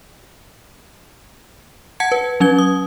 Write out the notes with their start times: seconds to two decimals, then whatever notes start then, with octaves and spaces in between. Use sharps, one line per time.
2.00 F#5 A5 G#6 C#7
2.12 B4
2.40 F#3 C#4 G#6 G7
2.59 D#6